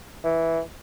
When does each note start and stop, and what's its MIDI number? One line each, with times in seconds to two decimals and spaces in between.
0.24 0.60 52